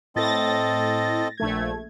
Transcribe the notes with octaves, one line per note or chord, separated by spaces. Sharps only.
A2 C4 A4 D#5 A6 A#6
A#1 A3 G#6